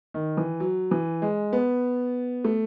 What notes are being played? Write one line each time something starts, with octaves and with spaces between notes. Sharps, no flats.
D#3
E3
F#3
E3
G#3
B3
A3